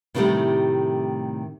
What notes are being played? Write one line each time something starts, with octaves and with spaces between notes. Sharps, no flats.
A2 C3 D#3 F3 G3 A3